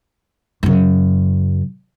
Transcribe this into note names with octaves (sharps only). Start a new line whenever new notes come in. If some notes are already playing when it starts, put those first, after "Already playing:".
F#2 C#3